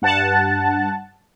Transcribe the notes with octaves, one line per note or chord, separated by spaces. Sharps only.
G2 F#5 A5